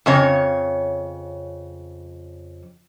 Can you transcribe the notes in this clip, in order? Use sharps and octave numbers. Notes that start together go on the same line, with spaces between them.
F2 C#3 C#5